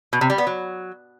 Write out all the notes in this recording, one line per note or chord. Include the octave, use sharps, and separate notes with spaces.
B2
C3
G3
B3
F#3